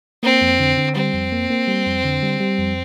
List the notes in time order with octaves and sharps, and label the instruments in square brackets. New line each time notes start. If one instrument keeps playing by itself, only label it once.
[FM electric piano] A#3 [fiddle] C4
[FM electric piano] F2
D3
D3
[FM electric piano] G3 [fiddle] C4
[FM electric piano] F2
A#3
A#3
G3
F2
D3
G3
G3
F2